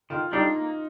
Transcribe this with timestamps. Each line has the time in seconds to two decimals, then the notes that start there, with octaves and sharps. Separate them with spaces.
0.10 D#3 F4
0.32 G3 D4 D#4 G4
0.54 A#3